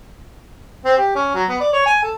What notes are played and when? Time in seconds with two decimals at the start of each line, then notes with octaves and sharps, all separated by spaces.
0.85 C4
0.97 G4
1.15 C#4
1.35 F#3
1.49 B3
1.60 D5
1.73 C#5
1.85 G#5
2.03 A4